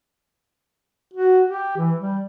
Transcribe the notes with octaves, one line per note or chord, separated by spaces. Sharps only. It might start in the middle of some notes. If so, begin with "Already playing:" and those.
F#4
G4
E3
G3